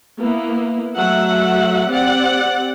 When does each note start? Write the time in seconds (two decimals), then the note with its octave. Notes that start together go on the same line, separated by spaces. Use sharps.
0.19 A#3 B3 E4
0.96 F#3 A3 E5 F#5
1.89 C4 G4 D5 F#5